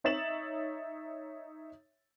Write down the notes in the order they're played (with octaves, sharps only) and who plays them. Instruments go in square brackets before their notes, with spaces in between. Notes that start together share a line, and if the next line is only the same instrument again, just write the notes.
[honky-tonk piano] D#4 C#5 E5 A6 E7 F#7